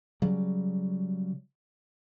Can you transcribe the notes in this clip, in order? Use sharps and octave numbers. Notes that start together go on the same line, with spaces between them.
C#3 F#3 G3